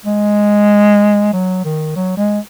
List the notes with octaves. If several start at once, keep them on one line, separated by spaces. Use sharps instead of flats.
G#3
F#3
D#3
F#3
G#3